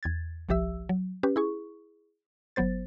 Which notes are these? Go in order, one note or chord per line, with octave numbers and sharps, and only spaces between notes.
E2 G#6 A6
G1 C2 F3 G4 E5 E6
F#3
C#4 G4 B4
E4 G#4 C#6
G1 F#3 B3 C5 A6